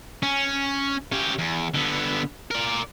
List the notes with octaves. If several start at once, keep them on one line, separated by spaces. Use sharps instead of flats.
C#4
C#4 G4
E2
D3 B3
A#4 D5